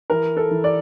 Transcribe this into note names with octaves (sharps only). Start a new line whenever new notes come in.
E3 A#4
A4
E3
D5